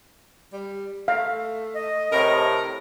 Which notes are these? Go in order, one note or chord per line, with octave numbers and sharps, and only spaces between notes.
G3
A3 F5
D#5
A2 C3 A#4